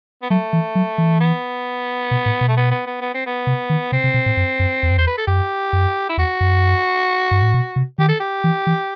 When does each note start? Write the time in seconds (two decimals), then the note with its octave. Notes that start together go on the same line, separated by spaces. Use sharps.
0.22 B3
0.30 F#3 A3
0.53 E3
0.75 F#3
0.98 E3
1.20 B3
2.11 B2
2.26 A2
2.41 B2
2.48 A3
2.57 B3
2.71 B3
2.86 B3
3.01 B3
3.14 C4
3.26 B3
3.47 C3
3.70 D#3
3.92 C3 C4
4.04 C3
4.14 B2
4.26 A2
4.37 F#2
4.59 F#2
4.83 E2
4.90 F#2
4.98 E2 C5
5.07 B4
5.17 A4
5.27 F#2 G4
5.73 F#2
6.09 E4
6.18 E2 F#4
6.41 F#2
7.31 G2
7.42 A2
7.54 B2
7.76 C3
7.98 D#3 G4
8.09 A4
8.20 G4
8.44 E3
8.67 E3